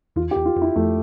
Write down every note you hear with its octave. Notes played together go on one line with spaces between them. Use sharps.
E2 F4
G4
E2
F4
F2
E4
F2 A3